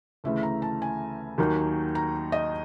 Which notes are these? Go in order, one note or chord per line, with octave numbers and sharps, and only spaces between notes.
D2 C#3 E3 A3 E5
A#5
A5
G#5
D#2 D#3 F#3 A#3 D#4
A#5
D#5